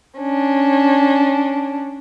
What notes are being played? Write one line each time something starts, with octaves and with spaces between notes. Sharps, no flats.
C#4 D4